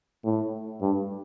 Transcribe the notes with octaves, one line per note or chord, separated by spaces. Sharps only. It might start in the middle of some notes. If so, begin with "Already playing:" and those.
A2
G2